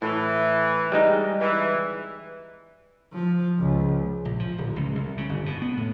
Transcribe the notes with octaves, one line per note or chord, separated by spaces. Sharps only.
A2 E3
G3 G#3 D#4
E3
F3
C#2
A#1
F3
D1
C#2
C2
C#3
G1
B2
B3
A2